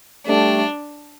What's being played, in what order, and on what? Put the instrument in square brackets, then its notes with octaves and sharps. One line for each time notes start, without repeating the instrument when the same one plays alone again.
[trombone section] G3 A3 [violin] D4